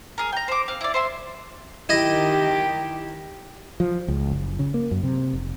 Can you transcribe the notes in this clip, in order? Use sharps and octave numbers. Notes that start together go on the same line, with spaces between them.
G#4 A#4
G5 A#5
C5 D6
C4 F5
E4 D5
C5 E5 C6
D#3 E4 G4 D#5
F3
C#2
F#1
C#3
A#3
F#2
C3
F1